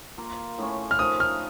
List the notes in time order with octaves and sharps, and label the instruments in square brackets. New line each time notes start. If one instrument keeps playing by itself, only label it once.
[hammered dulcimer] A#3 F4 A#4
A2 A3 C#4
[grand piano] F6
[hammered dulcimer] F3 A3 D#4 A#4 [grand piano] D#6
[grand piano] F6